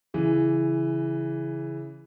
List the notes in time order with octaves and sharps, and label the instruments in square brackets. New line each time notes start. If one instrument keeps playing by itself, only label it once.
[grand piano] C#3 E3